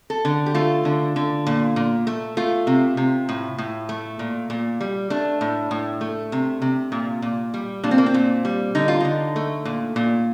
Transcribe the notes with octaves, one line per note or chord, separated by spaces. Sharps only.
A4
D3
G4
A3 F4
D3
D3
A#2
A#2
A3
A3 F4
C3
C3
A2
A2
A3
A#2
A#2
G3
A3 D4
A2
A2
A3
C3
C3
A#2
A#2
G3
A#2 D4
C4
A#3
C4
A#2
G3
D3 D#4
F4
D3 D#4
A3
A#2
A#2